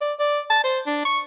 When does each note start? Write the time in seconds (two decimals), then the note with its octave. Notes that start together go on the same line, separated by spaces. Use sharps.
0.01 D5
0.19 D5
0.50 A5
0.64 C5
0.87 D4
1.06 C#6